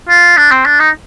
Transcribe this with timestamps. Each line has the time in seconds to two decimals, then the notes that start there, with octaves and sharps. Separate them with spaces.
0.09 F4
0.37 D4
0.51 C4
0.65 D4
0.79 D#4